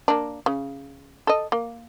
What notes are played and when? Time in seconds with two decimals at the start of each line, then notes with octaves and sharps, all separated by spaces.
0.08 A#3 D4
0.46 C#3
1.27 A4 D#5
1.52 A#3